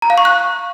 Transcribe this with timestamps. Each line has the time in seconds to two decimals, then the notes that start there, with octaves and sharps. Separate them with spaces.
0.02 A#5
0.10 F5
0.18 C#6
0.25 F#6